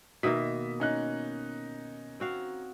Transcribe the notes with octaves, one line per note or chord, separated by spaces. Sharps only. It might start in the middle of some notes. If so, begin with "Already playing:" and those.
B2 D#3 A#3 E5 D#6 B6
C#4 D#4 F#6
C4 F#4 F5